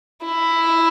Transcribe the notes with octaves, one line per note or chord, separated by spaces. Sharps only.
E4